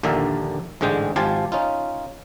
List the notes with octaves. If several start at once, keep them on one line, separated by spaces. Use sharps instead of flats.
A#1 D#2 D3 A#4 D5 E5
A1 G#2 D3 G#3 G5
G#1 F3 F4 G4 G#5 A5
C#4 D#4 F4